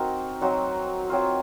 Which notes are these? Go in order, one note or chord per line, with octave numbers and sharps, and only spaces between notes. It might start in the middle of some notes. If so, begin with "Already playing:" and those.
Already playing: C4 D#4 F#4 A#4
F#3 C4 D#4 F#4
F#3 C4 F4